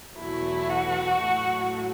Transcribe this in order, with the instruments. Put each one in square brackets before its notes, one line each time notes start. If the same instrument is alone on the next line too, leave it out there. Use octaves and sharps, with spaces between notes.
[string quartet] E2 B2 F#3 A3 [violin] E4
[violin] F#4
[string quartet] A2 F#3 A3